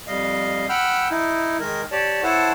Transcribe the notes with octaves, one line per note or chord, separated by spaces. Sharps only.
F2 G3 D#5 F5
F#5 G5 B5 E6 F6 G6
D#4 E4
D#3 G#3 A#4
G4 C#5 D5 A5
E4 A4 C5 C#5 F#5 A5